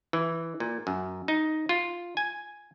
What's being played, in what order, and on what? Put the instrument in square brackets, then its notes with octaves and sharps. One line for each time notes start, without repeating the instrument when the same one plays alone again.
[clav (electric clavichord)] E3
A#2
F#2
D#4
F4
G#5